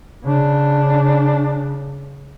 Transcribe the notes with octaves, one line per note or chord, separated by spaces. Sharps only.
C#3 D4